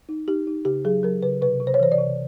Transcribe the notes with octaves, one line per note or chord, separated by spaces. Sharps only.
D#4
D#4 G4
D#4
C#3 G4
F#3 G#4
F#3 A#4
C#3 B4
C3 B4
C3
C5
C#5
E3 C5
D5
C3